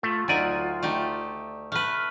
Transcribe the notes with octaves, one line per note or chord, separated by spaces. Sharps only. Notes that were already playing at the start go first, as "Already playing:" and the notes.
A3 F4
D2 F#3 D#4 D5 G#5
A3 D#4 G4
A3 B4 F6